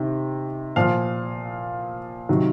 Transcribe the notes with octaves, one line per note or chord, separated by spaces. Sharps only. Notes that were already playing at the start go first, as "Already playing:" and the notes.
Already playing: C3 D#3
A#2 F3 F5
C3 D#3 F#3